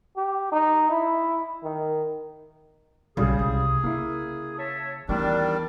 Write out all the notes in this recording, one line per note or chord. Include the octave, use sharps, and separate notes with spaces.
G4
D#4
E4
D#3
B1 C#3 G3 G#3 G#4 D#6
C2
C#3 A#3 E4
C#5 E5 A5
E2 D#3 G3 A3 D4